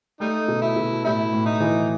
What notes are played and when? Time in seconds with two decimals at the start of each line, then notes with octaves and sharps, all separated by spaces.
0.20 G3 A3 D#4
0.48 B2
0.62 E4
0.76 B2
1.05 A2 G3 E4
1.33 A2
1.46 D#4
1.60 E3